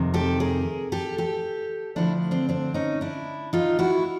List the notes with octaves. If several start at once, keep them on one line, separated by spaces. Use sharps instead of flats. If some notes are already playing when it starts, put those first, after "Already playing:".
Already playing: F2 C3 D#3
G4 A4
G#4 A#4
G4 A4
G4 A4
D2 D3 F3 A3 D4 E4
C4 D4
C4 D4
C#4 D#4
D4 E4
D#4 F4
E4 F#4